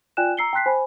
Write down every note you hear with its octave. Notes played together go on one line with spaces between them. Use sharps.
F4 D5 G5 G#5 F#6 E7
A#5 E6 C7 C#7 G7
G5 A5 C6 F#6 B6 C7
C5 G#5 B5